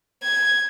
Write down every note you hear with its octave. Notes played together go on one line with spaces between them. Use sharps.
G#6